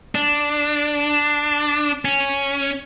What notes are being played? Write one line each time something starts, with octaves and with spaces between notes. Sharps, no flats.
D4
C#4